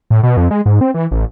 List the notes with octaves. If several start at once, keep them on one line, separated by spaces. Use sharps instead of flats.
A2
B2
F2
G#3
G#2
C4
E3
A1